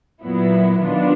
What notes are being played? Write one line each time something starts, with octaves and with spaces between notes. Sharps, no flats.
A#2 F#3 B3 E4
D#3 F#3 B3 D4 F4